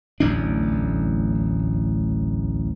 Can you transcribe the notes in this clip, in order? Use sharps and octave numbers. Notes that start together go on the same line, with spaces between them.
D1 A1 E2 D4